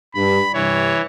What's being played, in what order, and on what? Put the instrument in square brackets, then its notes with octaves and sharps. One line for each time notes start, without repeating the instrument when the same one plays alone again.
[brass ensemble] G2 [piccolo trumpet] B5
[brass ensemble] G2 C3 [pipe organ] E3 [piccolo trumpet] C#5